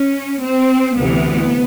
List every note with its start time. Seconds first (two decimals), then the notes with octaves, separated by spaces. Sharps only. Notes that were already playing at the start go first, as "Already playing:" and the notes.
Already playing: C#4
0.41 C4
0.96 D2 C3 E3 B3